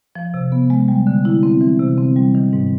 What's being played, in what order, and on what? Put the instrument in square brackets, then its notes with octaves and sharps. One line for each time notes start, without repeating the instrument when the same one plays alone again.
[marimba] F3
C3
B3
G#3
G3
D3
E4
C4
E3
C3
C4
G3
D#3
G#2